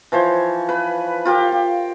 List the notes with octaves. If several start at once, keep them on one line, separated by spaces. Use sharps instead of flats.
E3 F3 C5 C#5
B4 B5
F4 G4 A#4
G4